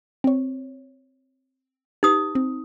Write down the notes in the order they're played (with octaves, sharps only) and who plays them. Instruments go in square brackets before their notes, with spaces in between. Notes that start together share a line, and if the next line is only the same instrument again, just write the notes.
[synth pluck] C4 C#5
[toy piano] D#4 D#6 [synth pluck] G4 B4
[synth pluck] C4